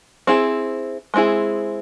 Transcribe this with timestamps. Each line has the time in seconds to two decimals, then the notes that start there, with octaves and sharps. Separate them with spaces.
0.27 C4 E4 G#4
1.14 G#3 C4 E4 G#4